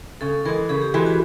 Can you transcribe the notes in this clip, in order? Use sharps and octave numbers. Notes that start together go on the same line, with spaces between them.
C#3 A4
E3 G#3 A#4
C#3 G#4
G4
E3 G#3 F#4
F#4